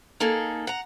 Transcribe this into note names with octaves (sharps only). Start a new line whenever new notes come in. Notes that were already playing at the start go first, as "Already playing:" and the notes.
A#3 D#4 G#4 A4
F#5 A#5